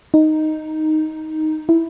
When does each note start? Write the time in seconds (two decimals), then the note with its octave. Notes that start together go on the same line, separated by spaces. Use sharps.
0.14 D#4
1.69 E4